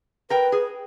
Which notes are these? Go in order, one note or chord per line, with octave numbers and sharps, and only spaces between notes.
A#4 B4 G5
G#4